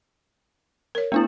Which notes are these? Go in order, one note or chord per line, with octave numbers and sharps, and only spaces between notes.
A#4 C#5
A3 B3 D4 E4